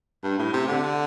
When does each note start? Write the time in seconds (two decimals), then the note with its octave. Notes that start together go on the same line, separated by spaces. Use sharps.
0.24 G2
0.39 A2
0.53 C3
0.68 D3